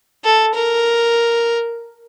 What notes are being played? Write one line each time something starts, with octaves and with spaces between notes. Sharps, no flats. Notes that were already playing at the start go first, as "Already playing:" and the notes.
A4
A#4